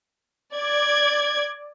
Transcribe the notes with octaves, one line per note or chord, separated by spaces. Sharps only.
D5 G#6